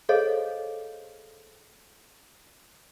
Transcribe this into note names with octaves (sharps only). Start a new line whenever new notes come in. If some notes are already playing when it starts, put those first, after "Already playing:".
G#4 A4 C5 C#5 D#5 F5